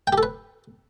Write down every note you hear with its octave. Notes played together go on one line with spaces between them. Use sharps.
G5
G4
A4
B4